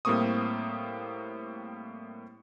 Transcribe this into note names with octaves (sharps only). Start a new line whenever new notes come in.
A2 G3 A#3 C4 C#6 D#6